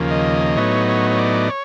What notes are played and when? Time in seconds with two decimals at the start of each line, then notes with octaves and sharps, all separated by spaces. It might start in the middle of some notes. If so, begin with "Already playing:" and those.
Already playing: D#2 C#3 F3 A#3
0.11 D#5
0.57 A2 F#3 B3 D#4 C#5
0.88 C#5
1.10 C#5
1.18 D5
1.49 C#5